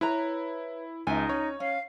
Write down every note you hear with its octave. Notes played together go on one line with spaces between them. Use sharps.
E4 B4 C#5 A#5
C#2 D#4 E5 G#5
C#4 C#5
C#4 F5